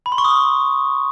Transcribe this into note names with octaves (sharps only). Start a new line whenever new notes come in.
B5
C6
C#6
D#6